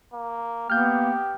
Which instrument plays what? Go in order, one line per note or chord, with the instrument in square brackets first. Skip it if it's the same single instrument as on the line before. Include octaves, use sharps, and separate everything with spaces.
[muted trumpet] A#3
[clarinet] A#3 [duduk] B3 [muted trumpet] G4 [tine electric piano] F6 G6